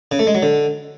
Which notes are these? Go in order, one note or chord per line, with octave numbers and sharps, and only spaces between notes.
C#3
A3
G#3
F#3
D3